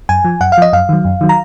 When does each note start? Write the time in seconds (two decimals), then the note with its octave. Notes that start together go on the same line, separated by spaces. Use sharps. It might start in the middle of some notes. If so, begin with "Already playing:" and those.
0.09 F#2 G#5
0.25 F3
0.41 F#2 F#5
0.52 F5
0.57 F3 D#5
0.73 F#2 F5
0.89 D#3 F#3
1.05 F#2
1.21 D#3 F#3
1.29 A#5